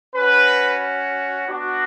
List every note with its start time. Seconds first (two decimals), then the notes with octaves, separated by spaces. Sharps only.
0.15 C#4 F#4 B4
1.48 B3 D4 F#4